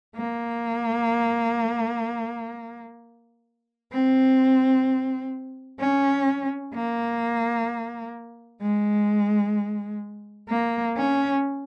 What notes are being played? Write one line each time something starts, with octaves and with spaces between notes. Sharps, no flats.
A#3
C4
C#4
A#3
G#3
A#3
C#4